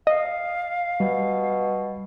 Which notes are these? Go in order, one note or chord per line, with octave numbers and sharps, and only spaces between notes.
D#5 F5
B2 G3